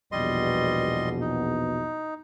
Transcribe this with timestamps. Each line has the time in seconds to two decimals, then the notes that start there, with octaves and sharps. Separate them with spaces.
0.12 A#1 E2 B2 G3 D#5 C6
1.21 D#4